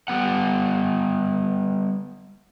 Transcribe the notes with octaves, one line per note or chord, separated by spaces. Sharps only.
G3 B3 F#5